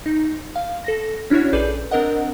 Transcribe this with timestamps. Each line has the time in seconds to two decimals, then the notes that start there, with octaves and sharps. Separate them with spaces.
0.06 D#4
0.56 F5
0.84 A4 A#6
1.30 C#4 D4 E4 F#4 C#5
1.53 A#1 G#4 A4 B4 D5 G6
1.91 C4 D4 A#4 D#5 F#5